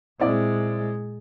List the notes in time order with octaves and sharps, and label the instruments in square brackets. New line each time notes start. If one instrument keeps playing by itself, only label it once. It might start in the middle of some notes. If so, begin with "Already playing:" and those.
[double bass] A#2 G#3 [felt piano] C4 E4 D5